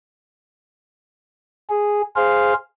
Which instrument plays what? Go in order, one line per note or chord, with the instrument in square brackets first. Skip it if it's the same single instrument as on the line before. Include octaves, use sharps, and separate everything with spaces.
[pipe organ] G#4
G#4 C5 F5